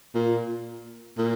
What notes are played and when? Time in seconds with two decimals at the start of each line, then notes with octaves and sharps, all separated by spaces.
0.14 A#2
1.18 A#2